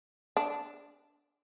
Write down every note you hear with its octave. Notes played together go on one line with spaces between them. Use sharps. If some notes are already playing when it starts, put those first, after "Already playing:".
D4